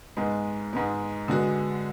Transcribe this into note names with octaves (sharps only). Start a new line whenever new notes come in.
G#2 G#3 B3
G#2 G#3 B3
D3 G#3 B3 F#4